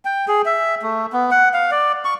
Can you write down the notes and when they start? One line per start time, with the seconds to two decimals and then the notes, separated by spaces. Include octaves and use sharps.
0.05 G5
0.28 G#4
0.45 E5
0.82 A3
1.13 B3
1.31 F#5
1.54 F5
1.71 D5
2.05 C#6